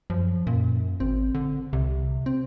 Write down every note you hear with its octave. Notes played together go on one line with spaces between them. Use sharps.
F#2 F3
F#2 A#2
G#1 C4
D3
C2 C3
C4